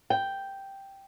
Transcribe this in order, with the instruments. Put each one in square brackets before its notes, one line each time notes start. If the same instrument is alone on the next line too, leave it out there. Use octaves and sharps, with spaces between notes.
[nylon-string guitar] G5